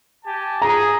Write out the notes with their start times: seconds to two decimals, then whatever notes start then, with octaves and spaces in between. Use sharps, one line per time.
0.24 G4 G#5 A5
0.62 G#4 A#5